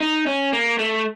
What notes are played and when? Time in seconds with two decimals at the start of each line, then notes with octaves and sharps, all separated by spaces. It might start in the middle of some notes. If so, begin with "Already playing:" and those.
0.01 D#4
0.27 C#4
0.53 A#3
0.79 A3